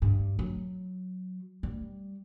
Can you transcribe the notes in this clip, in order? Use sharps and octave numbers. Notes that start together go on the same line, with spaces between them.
G2
F#3
G3